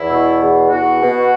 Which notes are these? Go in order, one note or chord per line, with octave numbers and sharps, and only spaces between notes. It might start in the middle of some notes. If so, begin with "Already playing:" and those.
Already playing: E2 E4
B2
E2
E2 F#4
B2